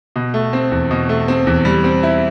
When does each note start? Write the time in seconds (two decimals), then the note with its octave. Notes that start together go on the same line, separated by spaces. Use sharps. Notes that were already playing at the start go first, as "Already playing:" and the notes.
0.16 B2
0.34 A3
0.53 C4
0.72 E2
0.91 B2
1.09 A3
1.28 C4
1.47 E2
1.65 G3
1.84 C4
2.03 E4